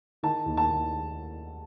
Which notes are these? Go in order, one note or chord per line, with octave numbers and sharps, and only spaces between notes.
D#3 A5
D#2
A5
D#2